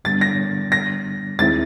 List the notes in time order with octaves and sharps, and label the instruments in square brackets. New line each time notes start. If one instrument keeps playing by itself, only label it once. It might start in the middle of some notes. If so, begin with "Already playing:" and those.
[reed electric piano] G2 D3 G3 B3 D4 [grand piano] A6
[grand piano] A#6
A#6
[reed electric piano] D#2 D#3 G#3 C4 E4 [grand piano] A6